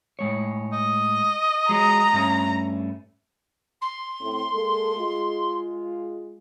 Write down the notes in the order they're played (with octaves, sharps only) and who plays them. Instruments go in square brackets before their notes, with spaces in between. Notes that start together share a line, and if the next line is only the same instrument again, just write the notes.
[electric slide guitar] A2 G#3 C#5
[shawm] D#5
[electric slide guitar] F#3 G#3 [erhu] A#5
[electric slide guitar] G2 A3 C#4
[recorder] C6
[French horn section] A2 A3 C4
G#3 A#3 A4
G#3 F4